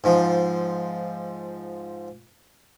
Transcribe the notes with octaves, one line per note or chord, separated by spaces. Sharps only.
G#2 F3